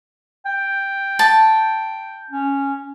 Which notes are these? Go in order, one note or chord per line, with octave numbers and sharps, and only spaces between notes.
G5
A5
C#4